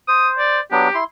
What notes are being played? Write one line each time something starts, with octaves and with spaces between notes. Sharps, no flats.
C5 D#6
D5
F#3 B3 D4 G4
E4 C6